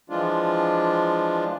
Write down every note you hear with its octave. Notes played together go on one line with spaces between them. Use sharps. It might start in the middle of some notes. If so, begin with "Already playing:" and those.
E3 F3 G#3 D4 F4